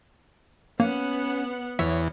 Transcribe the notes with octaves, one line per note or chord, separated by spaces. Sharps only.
A#3 B3 C#4 F#5
E2 C#5 E5